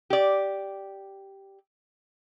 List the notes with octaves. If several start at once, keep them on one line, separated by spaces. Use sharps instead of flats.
G4 D5